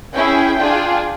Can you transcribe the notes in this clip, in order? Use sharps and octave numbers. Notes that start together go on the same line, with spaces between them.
C#4 E4 G#4 G5
D4 F4 G#4